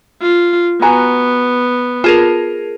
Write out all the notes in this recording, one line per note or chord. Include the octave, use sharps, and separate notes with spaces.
F4
B3 F#4 G#5 A#5
F4 G#4 A#4 A5